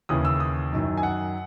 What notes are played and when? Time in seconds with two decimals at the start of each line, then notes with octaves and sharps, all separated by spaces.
0.09 D#2 C#3 E3 D#6
0.25 E6
0.40 D#6
0.72 F#2 D#3
0.97 G#5
1.03 F#5